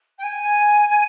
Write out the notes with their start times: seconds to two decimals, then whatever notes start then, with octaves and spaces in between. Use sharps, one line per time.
0.18 G5
0.23 G#5